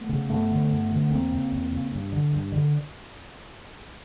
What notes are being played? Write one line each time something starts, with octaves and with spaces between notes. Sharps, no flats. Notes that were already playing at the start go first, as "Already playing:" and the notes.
Already playing: A3 B3
C#3
G2 A3 B3
D3
G2
D3
E2 A#3 C4
C#3
E2
C#3
G2
D3
G2
D3